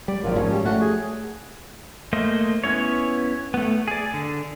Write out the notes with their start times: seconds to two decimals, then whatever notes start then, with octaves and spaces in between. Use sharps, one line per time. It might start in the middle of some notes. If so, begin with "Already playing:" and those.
0.08 G3 D5
0.22 G#1 A#2 F3 F#3
0.36 G#2 F3 C#4
0.51 G3
0.65 A3 F#4
0.81 G#4
2.13 A3 A#3 C5 D#5
2.64 B3 C#4 E4 C#5
3.54 A3 B3
3.88 G#4 D5
4.14 D3